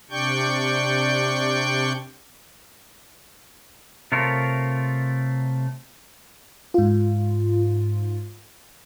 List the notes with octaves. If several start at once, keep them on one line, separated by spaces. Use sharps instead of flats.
C3 D4 D5 G5 C#6 G6
C3 A3 F4 A#4 C#5
G#2 F4